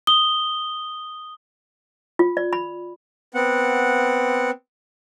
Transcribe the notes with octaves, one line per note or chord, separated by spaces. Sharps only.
D#6 G7
F4
D5
B5
B3 C4 F#5